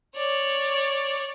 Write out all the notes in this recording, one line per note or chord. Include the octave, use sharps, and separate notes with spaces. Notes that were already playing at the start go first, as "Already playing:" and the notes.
C#5 D5